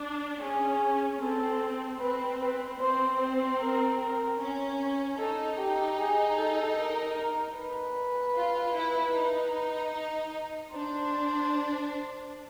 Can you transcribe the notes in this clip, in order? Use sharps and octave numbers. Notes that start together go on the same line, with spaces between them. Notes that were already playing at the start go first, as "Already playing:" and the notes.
Already playing: D4
C#4 G#4
C4 A4
C4 B4
B4
C4 C5
C5
A#4
A#4
C#4
D#4 A4
G4
G#4
A4
A#4
B4
F4
E4
D#4
D4 C5